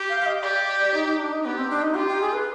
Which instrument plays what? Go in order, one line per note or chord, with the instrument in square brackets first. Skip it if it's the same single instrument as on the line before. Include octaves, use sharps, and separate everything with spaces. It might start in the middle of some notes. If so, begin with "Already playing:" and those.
Already playing: [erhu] G4
[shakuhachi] F5
F5
D#5
[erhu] G4 [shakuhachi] D5
[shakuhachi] D#4
D#4
D4
D#4
[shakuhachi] B3 [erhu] G4
[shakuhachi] C4
D4
D#4
[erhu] F4 [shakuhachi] G4
[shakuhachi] G4
G#4
B4